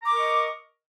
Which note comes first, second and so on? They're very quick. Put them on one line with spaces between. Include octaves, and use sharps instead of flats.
A#5 D6 A#4 C#6 D#5